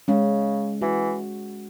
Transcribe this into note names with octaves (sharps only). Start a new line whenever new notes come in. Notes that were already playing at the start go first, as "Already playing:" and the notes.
C#3 G#3 C#4
E3 F#4